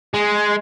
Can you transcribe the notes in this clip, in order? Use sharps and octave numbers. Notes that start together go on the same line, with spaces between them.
G#3